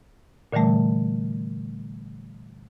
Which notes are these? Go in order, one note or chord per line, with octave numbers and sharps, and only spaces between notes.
A#2 D3 E3 G3 A3